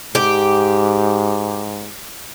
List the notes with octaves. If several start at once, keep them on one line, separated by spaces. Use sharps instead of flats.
G#2 G4